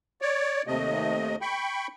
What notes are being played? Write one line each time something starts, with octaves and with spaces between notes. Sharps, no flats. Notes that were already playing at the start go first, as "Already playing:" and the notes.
C#5 D5
D#2 C3 A3 D#5
G5 B5 C#6